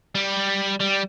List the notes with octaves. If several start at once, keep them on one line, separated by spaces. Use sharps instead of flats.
G3
G3